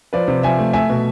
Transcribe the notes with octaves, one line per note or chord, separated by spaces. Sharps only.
F3 B4 D5
C3
F3 E5 G#5
A3
A3 E5 G#5
B2